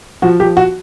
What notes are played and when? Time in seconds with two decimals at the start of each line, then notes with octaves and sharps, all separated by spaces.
0.22 F3 F#4
0.40 F3 G4
0.57 F#4